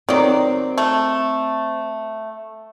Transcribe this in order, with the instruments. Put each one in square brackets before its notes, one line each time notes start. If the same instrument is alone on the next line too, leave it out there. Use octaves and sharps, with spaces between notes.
[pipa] D#3 F#3 [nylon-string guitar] C4 D5
[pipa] A3